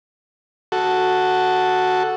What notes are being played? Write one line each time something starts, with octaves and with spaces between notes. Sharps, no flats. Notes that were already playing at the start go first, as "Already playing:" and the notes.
F#4 A4